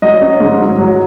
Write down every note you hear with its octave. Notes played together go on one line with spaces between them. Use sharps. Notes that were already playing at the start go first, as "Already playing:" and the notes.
F#3 D#5
C#4
G#2
F#3
F#3